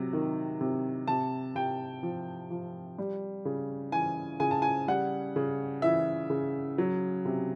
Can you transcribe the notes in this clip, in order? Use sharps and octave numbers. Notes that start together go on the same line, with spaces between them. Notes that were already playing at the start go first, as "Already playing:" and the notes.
Already playing: C3 F#3
D#3
C3
C3 A5
C3 G5
F3
F3
G3
C#3
E3 G#5
C#3 G#5
A5
G#5
G3 F#5
C#3
E3 E5
C#3
F#3
C3